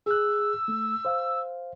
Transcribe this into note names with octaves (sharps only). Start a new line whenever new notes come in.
G#4 E6 F#6
A3
C5 F5